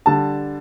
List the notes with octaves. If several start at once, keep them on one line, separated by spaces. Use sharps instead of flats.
D3 G3 A5